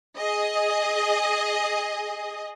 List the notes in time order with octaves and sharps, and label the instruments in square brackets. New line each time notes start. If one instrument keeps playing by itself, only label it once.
[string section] G#4 D#5